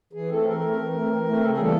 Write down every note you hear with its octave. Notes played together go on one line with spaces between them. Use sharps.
E3 G#4
A3 C4 A4
E3 A#4
A3 C4
E3
A3 C4
E3
A3 C4
C#3 A4
G#4
E3 G3 A#3 A4